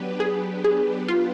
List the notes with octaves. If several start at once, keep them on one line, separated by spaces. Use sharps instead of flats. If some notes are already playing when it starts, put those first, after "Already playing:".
Already playing: F#3 B3 D4 G4 B4
G#4
G#4
F4